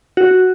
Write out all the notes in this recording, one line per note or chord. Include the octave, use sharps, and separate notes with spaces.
F#4